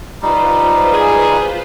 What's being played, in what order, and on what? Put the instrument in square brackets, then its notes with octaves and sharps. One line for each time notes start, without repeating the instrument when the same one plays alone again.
[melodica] G3 D#4 [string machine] F4 B4 C5
[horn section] G#4